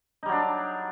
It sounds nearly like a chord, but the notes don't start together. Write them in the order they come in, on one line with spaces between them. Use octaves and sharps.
D#4 G3 F#3 D4